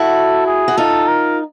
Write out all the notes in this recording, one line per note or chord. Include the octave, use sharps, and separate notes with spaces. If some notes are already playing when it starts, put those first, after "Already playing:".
Already playing: E4 F#4 A4
G#4
F#4
D#4 F4 A4
A#4